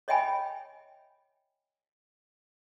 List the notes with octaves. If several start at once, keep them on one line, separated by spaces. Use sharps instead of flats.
C#5 D#5 E5 G5 G#5 B5